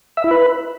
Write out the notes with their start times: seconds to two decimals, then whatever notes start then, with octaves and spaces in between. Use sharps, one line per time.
0.17 E5
0.24 E4
0.31 B4